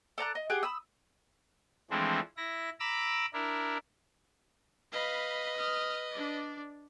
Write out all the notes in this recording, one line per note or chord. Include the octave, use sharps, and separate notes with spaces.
A4 D5 A#5 F#6
D#5
G4 G#4 F#5 G5
B5 D#6 E6
E3 F3 G#3 A3 C4 D4
E4 A#6
A#5 B5 D6 E6
D4 E4 A#4
B4 D#5 F5 B5
D#6 F6
D4 D5